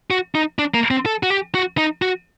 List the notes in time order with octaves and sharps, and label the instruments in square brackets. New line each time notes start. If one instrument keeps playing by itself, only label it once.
[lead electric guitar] F#4
D#4
D4
A#3
C4
A4
F#4
G4
F#4
D#4
F#4